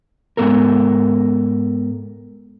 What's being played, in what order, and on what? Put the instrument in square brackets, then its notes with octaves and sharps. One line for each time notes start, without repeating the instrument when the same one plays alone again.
[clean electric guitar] G#2 C3 B3 A4 A#4